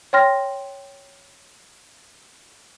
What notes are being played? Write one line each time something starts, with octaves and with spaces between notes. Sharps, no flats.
C#5 G5 C6 F6 A#6